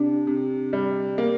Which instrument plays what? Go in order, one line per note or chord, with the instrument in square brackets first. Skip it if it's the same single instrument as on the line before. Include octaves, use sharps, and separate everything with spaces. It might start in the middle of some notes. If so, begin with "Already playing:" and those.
Already playing: [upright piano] C3 [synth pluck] D4
[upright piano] C3
G3
A#3